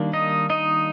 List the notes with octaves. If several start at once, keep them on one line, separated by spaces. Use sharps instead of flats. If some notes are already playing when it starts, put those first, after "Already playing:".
Already playing: D#3 G3 A#3 D4
D#4 D#5
D#4 D#5